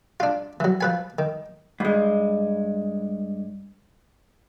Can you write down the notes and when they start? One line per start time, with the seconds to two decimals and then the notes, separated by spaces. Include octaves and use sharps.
0.20 D4 F4
0.60 E3 F#3
0.81 F3 B4 G#5
1.19 D#3
1.80 G2 G#3